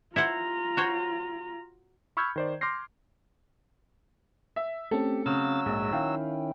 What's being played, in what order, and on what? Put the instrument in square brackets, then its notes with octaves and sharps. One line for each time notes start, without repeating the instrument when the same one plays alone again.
[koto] E4 C5 F#5 [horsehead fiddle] F4 A#5
[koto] F#4 C5 C#5
[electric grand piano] B5 C#6 E6 F6 G6 G#6
D#3 C5 D5
C6 D6 F6 G6 A#6 C7
[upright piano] E5
[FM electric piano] A3 C4 C#4 [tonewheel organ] G4 [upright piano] A4
[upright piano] C#3 [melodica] F#3 E6 [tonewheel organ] A6
[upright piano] A#1 [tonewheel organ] G#2 G#3
[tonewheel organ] D#3 C#4 E4 [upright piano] F5 [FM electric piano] G5